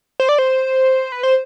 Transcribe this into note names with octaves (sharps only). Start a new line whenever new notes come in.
C5
D5
C5
B4
C5